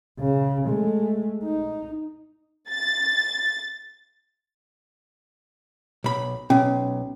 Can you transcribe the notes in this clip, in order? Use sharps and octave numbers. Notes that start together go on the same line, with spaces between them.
C#3
G#3 A3
D#4
A6
B1 B5
B1 C#4